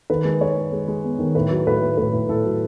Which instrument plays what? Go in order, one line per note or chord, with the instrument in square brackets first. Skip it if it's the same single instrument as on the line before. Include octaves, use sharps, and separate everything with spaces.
[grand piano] D#3 B4
G#3
G#3 C#5
G#3
G#3
G#3
B3
D#3
A2 B4
F#3
A2 B4
A3
A2 B4
A2
A2 A4
F#3